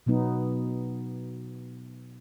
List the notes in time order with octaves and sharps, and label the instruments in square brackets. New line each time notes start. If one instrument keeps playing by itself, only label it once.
[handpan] B2 F#3 B3 D#4